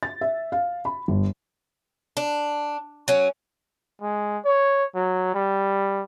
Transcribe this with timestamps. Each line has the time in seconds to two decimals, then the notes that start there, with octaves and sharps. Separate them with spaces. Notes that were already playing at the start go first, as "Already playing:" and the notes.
0.03 A6
0.21 E5
0.52 F5
0.85 B5
1.08 G1
2.17 D4
3.08 F#3 C#4
4.01 G#3
4.45 C#5
4.95 F#3
5.34 G3